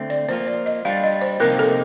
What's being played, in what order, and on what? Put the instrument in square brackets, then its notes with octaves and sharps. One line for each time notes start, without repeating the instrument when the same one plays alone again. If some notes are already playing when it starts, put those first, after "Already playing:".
Already playing: [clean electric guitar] D3 A3 C4
[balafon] D5
[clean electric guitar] F3 A#3 F4 [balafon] C5
[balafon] D5
D#5
[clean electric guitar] G3 D4 F4 [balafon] F5
[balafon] D#5
C5
[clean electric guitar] C3 F3 A#3 D#4 G4 [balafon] A#4
[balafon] A4